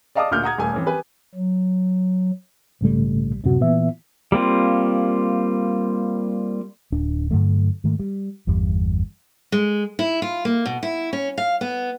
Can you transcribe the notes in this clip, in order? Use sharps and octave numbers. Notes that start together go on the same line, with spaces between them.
D5 D#5 F5 A5 D6 D#6
D2 A#2 F6 G6
F#5 A#5 D#6 G#6
D#1 A3 G#5
E3 C4 C#4
G4 B4 G#5
F#3
A#1 G#2 C#3 G3 A3
D1 F#2 C3 C4 F#4
A#2 E3 B3 E5
G3 A#3 C4 F4
D1 D4
G2 D3 F#3 A3
G#2 D#3 A3
G3
G1 E2 G3
G#3
E4
F4
A#3
B2
E4
C#4
F5
B3